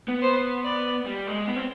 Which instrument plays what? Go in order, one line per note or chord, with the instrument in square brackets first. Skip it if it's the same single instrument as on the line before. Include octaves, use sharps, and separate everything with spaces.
[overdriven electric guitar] B3
[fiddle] C5
D5
[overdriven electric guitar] G3
G#3
B3
C4